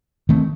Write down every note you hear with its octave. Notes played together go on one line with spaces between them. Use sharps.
D#3 A3 C4